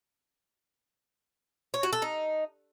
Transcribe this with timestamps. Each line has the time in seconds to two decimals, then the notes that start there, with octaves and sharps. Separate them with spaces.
1.74 C#5
1.83 F#4
1.93 A4
2.02 D#4